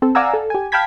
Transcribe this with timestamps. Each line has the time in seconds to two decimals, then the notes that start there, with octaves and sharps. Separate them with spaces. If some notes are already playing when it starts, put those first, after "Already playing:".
0.02 C4 A4
0.15 D5 F5 F#5 G#5 A#5 E6
0.34 A4
0.50 G4 G#5
0.72 F5 G5 A5 B5 G#6 B6